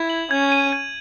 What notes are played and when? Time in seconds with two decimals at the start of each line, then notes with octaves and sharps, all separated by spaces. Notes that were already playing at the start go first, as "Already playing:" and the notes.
Already playing: E4 G#6
0.10 F#7
0.30 C#4 G#6
0.52 D#7
0.72 G#6